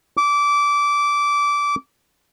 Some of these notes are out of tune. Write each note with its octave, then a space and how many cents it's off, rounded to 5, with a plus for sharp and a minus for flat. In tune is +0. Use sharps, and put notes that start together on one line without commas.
D6 -20